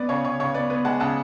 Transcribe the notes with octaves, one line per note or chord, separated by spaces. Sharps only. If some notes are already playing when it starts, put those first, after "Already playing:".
Already playing: B3 D5
C#3 C#5
C#3 C#5
C#3 C#5
B3 D5
B3
G#3 F#5 A5
C#3 F#5 A5